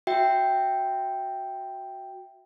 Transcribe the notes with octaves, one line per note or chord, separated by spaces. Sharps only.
F#4 E5 G5